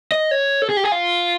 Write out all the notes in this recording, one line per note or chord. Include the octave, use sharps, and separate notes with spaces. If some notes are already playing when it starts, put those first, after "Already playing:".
D#5
C#5
A4
G#4
G4
G#4
F4